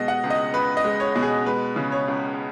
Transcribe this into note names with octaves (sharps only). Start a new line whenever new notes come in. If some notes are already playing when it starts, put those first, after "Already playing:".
Already playing: B2 G#3 D#5
F#5
C#2
D#5
C#2 B4
D#5
G#3
C#5
B2
G#4
G#3 B4
C#3
C#5
C#2